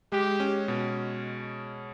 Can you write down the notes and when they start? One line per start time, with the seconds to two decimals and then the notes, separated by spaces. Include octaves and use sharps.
0.12 G#3 G4
0.40 C#4
0.68 B2